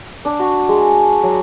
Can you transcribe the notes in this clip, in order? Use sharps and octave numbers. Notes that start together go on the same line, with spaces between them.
D4
F#4
G#3
F#3